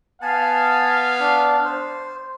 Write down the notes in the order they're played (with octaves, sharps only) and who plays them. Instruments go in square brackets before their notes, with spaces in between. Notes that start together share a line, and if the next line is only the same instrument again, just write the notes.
[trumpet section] B3 F5 [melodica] G#5 A5
[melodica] D4
C5